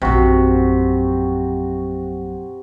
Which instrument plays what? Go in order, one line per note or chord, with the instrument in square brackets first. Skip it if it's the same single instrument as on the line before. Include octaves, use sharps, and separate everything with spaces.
[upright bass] A#1 F#2 [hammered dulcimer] C3 F#4